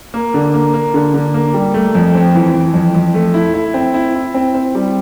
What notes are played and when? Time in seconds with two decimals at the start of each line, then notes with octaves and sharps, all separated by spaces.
0.14 A#3
0.34 D3
0.54 A#3
0.74 A#3
0.94 D3
1.14 D3
1.34 A#3
1.54 G3
1.74 A3
1.95 F2
2.15 C4
2.35 E3
2.54 E3
2.74 F2
2.95 F2
3.14 A3
3.34 E4
3.54 E4
3.74 C4
3.94 E4
4.15 E4
4.34 C4
4.54 C4
4.75 G3